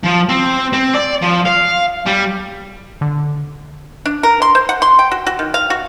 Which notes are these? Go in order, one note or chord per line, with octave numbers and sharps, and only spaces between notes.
F3
C4
C4
D5
F3
F5
G3
D3
D4
A#4
C6
C5
F#5
C6
G5
F#4
F#4
D#3
F5
F#4